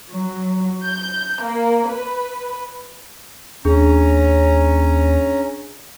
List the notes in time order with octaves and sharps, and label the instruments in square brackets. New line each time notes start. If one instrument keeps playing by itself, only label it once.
[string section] F#3
G6
A#3
B4
[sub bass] D#2 [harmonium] C#4 A#5 [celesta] D4 G#4